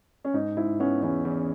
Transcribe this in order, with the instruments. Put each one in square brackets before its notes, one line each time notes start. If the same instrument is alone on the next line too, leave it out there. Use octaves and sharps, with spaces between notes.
[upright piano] C#4
[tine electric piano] G#2 [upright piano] D#4
[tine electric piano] G#2 [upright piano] E4
[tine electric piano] B3 [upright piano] C#4
[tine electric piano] E2 [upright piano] C#4
[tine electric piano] E2